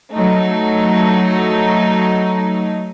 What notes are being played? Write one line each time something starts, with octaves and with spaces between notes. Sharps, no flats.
F#3 A3 D#4